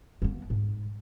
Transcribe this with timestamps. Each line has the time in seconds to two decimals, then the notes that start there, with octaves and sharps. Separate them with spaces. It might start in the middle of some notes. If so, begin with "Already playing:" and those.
0.22 A#3 B3
0.50 G#2